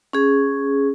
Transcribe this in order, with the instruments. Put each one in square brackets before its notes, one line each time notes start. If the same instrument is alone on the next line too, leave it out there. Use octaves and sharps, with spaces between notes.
[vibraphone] C#4 G#4